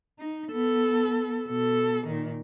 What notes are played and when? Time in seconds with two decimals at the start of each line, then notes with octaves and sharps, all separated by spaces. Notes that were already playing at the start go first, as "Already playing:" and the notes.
0.19 D#4
0.52 B3 A4
1.48 B2 A4
2.07 A#2 D#3